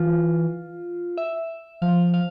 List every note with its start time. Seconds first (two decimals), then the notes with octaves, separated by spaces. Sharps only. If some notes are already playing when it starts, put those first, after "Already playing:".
Already playing: E3 F4
1.18 E5
1.82 F3 F5
2.14 F5